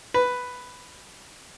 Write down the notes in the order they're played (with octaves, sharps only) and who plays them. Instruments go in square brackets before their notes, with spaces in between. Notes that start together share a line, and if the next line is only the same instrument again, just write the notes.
[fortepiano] B4